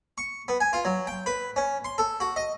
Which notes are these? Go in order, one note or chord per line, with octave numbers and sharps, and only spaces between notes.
C#6
B3
G#5
F4
F#3
G5
B4
C#4
C6
A4
F#4
D#5